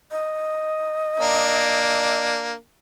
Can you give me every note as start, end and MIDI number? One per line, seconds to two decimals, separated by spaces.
0.11 2.25 75
1.20 2.54 58
1.20 2.54 62